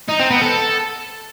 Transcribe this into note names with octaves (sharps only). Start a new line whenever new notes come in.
D#4
C4
B3
A4